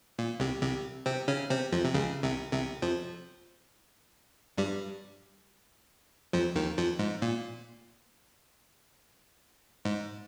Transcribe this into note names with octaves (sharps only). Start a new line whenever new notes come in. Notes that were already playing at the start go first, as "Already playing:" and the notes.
A#2
C2 C3
C2 C3
C3 C4
C#3 C#4
C3 C4
F2 F3
C3
C#2 C#3
C2 C3
C2 C3
F2 F3
G2 G3
F2 F3
D#2 D#3
F2 F3
G#2
A#2
G#2